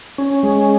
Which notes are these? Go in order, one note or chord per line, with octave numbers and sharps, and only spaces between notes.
C#4
G#3